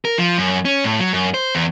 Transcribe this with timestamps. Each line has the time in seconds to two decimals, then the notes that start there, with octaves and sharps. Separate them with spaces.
0.05 A#4
0.18 F3
0.38 F#2
0.65 C#4
0.84 A2
0.99 F#3
1.13 F#2
1.34 C5
1.55 E2